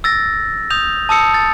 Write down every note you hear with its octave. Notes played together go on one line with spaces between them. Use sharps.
E6 A6 A#6
D#6 G6 F7
A5 D#6 E6 C#7
A6